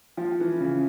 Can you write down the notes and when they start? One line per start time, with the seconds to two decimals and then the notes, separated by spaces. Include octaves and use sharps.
0.17 F3
0.40 E3
0.60 C#3